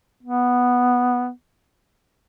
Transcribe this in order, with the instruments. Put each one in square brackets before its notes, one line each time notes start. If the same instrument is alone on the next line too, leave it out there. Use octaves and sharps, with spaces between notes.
[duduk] B3